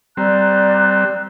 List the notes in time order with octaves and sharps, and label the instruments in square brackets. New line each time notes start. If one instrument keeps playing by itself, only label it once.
[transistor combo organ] G3 C4 [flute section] D5 A#5 F#6